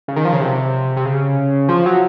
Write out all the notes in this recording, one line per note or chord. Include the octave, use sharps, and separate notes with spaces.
C#3
D#3
F3
C#3
C3
C3
C#3
F3
F#3